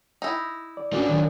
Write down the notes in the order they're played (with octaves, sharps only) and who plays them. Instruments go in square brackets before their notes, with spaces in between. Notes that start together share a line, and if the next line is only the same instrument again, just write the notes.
[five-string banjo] D#4 E4
[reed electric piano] D5
[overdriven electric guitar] A#3 D4 [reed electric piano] C#4 F#4 D6
[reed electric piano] D#3 F#3 C#5